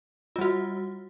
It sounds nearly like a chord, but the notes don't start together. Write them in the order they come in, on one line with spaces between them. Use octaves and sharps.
F4 G3 F#4